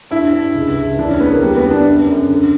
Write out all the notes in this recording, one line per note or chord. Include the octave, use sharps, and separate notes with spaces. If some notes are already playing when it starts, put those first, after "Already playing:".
G2 E4
G2
C#2
C#2
E3 D4
C#4
C#3 B3
A#3
D3 G3
B3
F#2
D4
F#2
F#2
D3